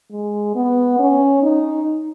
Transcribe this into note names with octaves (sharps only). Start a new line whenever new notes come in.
G#3
B3
C#4
D#4